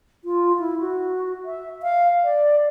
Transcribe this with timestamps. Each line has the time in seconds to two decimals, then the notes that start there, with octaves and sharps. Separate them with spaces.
0.24 F4
0.59 E4
0.79 F#4
1.45 E5
1.83 F5
2.24 D5